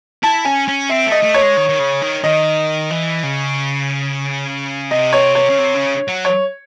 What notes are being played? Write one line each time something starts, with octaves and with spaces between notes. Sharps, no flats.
E4 A5
C#4 G#5
C#4
C4 E5
A3 D#5
A3
C#5
G#3
D#3
D#3
C#3
D#3
D#3 D#5
E3
C#3
C3 D#5
C#5
C#5
C#3
C3
C#3
F#3
C#5